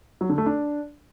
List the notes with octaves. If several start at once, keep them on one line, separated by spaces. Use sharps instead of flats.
F#3
D3
A3
D4